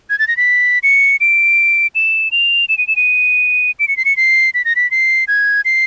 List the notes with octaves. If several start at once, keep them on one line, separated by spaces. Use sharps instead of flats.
G#6
A6
A#6
B6
C#7
D7
E7
F7
E7
D#7
E7
D#7
D7
C#7
C7
C#7
C7
B6
A#6
B6
C7
G#6
C7